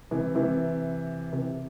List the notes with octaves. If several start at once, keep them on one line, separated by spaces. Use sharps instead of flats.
C3 E3
C3 E3
C3